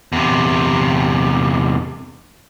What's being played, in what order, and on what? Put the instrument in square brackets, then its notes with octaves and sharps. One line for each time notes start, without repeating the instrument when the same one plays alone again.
[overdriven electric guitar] E2 C3